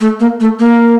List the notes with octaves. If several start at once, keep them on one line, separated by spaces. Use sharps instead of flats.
A3
A#3
A3
A#3